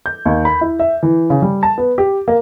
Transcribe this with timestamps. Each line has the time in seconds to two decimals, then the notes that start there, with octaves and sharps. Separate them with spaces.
0.06 G6
0.26 D#2
0.45 B5
0.61 E4
0.79 E5
1.03 E3
1.30 C#3
1.42 G3
1.63 A5
1.78 B3
1.98 G4
2.28 A#3